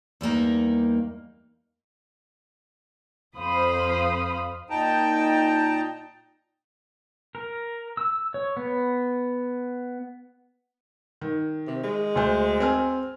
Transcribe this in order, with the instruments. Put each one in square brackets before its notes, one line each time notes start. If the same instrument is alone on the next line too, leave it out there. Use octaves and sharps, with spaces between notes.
[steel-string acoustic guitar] E2 G3 A#3 D#4
[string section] F2 C5 F5 B5 D#6
[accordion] A#2 D#4 G5 A5 A#5
[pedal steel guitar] A#4
E6
C#5
B3
[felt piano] D#3
[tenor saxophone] C3
G#3
[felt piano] D2 C5
C4 G#5 F6